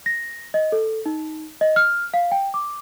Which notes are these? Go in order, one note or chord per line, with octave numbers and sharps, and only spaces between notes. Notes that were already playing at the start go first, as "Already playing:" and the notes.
A#6
D#5
A4
D#4
D#5
F6
F5
G5
D6